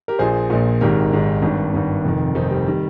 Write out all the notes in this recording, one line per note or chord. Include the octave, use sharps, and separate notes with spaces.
G4 A#4
A#1 A#2 G#4 C5
A#1 A#2
G#1 G#2 D#3 G4 A#4
G#1 G#2 D#3
G#1 G2 D#3
G#1 G2 D#3
F1 F2 D#3
F1 F2 D#3 C4 D#4
G3
D#3 G3